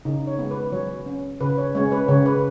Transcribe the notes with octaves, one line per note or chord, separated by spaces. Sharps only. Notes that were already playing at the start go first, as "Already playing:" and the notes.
C#3 D#4
C#5
G#3 B3
B4
F#3 C#5
C#4
C#3 B4
C#5
G#3 C#4 C#5
B4
C#3 C#5
B4